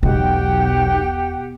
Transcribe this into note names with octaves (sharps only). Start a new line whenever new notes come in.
E1 B1 B2 G#3 G4 F#5 G5